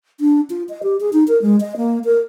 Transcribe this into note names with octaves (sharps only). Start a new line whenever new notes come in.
D4
F4
D#5
G4
G#4
D#4
A#4
G#3
D#5
A#3
A#4